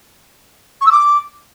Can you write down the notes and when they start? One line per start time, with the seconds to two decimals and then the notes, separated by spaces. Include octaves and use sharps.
0.81 C#6
0.86 E6
0.91 D6